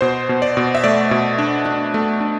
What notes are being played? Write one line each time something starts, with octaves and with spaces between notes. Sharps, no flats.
B2 C5
B2
D5
B2
E5
A3 D5
B2
D4
D4
A3
D4